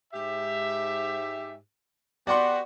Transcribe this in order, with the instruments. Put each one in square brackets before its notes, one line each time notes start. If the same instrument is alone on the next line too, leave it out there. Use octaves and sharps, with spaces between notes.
[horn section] G#2 G4 E5
[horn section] B3 F#4 G4 [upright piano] D5 F#5 C6